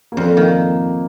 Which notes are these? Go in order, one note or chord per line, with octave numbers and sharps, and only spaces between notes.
A#3
F2 C4
D#3 A#3